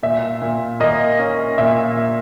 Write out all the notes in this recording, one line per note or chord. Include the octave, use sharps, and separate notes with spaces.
A#2 E5
A#2
A#3 D#5
C#4
A#2 E5
A#2